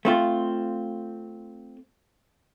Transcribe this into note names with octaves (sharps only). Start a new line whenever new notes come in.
A3 C4 F4